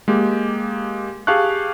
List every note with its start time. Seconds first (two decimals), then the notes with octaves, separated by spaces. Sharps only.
0.08 G#3 A#3 G4
1.27 G4 G#4 F5 A5 C#6 F#6